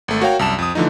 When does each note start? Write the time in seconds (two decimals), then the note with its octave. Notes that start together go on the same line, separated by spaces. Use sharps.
0.08 G#1 A3
0.21 F#4 A#4 C#5 F5 G5
0.39 C2 F#2 A5 E7
0.58 F2 D#6
0.75 D3 E3 F3 A3 D#4